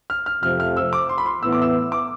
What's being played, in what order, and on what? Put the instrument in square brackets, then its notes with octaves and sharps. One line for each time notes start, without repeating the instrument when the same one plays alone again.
[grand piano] F6
F6
[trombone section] F2 C3 F3 A3 C4 [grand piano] F6
[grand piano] F6
E6
D6
C6
B5
C6
[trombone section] A2 E3 B3 E4 [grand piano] E6
[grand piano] D6
E6
D6